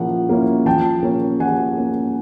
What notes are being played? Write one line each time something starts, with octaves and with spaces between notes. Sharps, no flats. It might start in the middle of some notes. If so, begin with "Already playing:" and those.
Already playing: F3 A#3 C#4 E4 F#5
A#3 C#4 E4
F3 G5 A5
A#3 C#4
F3 F#5 G#5
A#3 C#4